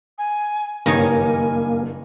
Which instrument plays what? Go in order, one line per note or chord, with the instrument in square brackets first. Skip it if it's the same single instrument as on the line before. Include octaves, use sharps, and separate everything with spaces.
[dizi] G#5
[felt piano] F#1 G2 [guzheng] D#3 D#4 C#5 [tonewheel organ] A#3 [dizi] G#5